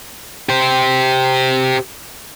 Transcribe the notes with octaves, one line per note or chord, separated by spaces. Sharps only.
G4 C5